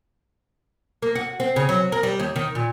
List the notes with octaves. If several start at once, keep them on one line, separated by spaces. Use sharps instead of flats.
A#3
F#4
C4
C#3
F#3
A#4
G3
D#2
D#3
A#2